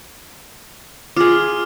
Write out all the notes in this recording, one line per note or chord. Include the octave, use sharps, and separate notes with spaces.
F4 G#4 D6 F6